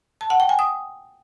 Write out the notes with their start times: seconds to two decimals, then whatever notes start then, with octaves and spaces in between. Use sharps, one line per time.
0.21 A5
0.30 F#5
0.40 G5
0.49 G#5
0.59 D#6